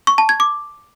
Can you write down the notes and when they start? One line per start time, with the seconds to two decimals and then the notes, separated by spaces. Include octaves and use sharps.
0.07 C#6
0.18 A5
0.29 G#6
0.40 D6